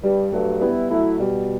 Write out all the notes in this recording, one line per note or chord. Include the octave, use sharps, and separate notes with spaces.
G2 G3
G2 F#3 A3
G3 B3 E4
F#3 A3 E4
B2 G3